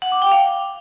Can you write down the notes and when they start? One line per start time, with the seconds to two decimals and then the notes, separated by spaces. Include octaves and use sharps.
0.02 F#5
0.12 D6
0.22 G5
0.32 F5